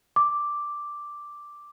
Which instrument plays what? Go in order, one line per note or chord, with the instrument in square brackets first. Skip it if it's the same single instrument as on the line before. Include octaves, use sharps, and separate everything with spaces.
[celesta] D6